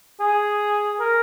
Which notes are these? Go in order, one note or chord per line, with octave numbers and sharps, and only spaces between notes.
G#4
A#4